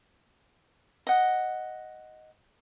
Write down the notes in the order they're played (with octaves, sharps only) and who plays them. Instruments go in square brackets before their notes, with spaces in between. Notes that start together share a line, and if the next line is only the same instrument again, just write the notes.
[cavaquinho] D#5 F#5